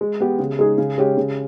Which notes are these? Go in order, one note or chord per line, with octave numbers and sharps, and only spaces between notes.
G#3
B3 G4
C#3
G#3 D#4 G#4
C#3
G#3 C#4 G4
C#3